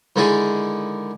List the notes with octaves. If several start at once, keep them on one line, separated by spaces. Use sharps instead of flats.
D3 D#3 G#3 E4 G#4 D5